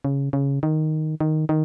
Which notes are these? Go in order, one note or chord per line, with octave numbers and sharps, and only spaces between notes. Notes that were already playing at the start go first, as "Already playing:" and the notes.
C#3
C#3
D#3
D#3
D#3